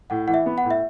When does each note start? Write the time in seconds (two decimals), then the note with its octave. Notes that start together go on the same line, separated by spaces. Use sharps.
0.10 A2 F#5
0.27 E3 F#5
0.34 E5
0.46 B3
0.58 F#5
0.65 A2
0.71 E5